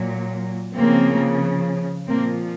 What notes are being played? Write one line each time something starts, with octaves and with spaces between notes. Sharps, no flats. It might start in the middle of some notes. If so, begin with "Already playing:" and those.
Already playing: A#2 F#3
C#3 F3 A#3 C4
A#2 F3 A#3 C4